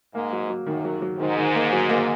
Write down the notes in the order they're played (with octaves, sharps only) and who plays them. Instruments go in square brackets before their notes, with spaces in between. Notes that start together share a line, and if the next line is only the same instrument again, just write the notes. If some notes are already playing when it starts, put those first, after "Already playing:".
[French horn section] G#2 [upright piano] A#3
[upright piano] F#3
F#3
[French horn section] F#2 [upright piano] D#3
[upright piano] F#3
F#3
[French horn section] G#2 [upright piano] D#3
[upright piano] D#3
A#3
F#3
A#3